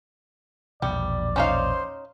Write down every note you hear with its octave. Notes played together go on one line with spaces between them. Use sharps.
A#1 E2 B2 G3 D5
C#4 D#4 C5 F5